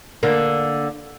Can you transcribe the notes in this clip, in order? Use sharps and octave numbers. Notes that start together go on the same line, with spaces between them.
D3 A#3